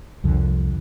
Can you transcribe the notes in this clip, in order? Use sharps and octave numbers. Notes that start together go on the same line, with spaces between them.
C2 F2 D3 F3